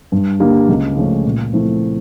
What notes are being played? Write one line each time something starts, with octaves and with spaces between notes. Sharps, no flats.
G2
D3 G3 A#3
C#2
C#3 F3 A3 C#4
A#2
F3 A3 C4 E4